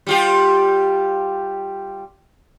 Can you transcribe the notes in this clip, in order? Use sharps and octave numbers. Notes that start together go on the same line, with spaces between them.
G3 F4 G4